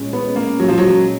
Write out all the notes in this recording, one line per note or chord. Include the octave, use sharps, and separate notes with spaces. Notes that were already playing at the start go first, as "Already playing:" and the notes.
Already playing: A#2 G#3 C#4
B3
A#3
F#3
F3
F#3